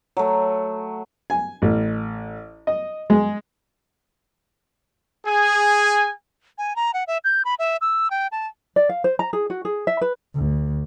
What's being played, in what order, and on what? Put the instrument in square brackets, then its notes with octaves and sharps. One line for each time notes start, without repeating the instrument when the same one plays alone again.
[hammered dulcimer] F#3 A3
[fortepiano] G#5
A1
D#5
G#3
[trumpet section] G#4 G#5
[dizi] G#5
A#5
F#5
E5
G6
B5
E5
E6
G5
A5
[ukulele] D5
F5
C5
A#5
G#4
F#4
G#4
E5
B4
[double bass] D2